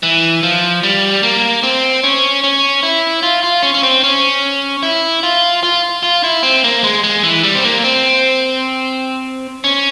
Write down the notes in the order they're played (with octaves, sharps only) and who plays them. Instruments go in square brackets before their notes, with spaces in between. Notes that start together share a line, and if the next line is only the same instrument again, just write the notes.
[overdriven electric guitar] E3
F3
G3
A#3
C4
C#4
C#4
E4
F4
F4
C#4
C#4
C4
C#4
E4
F4
F4
F4
E4
C4
A#3
G#3
G#3
E3
G3
C4
A#3
C4
C#4